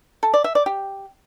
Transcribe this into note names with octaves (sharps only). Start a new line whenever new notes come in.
A4
D5
E5
D5
G4